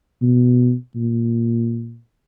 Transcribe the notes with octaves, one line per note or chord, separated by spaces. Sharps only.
B2
A#2